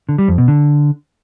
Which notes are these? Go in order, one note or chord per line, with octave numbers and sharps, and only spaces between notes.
D3
G3
F2
B2
D3